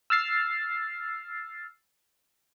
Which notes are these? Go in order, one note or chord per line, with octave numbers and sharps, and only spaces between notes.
E6 F6 A6 C7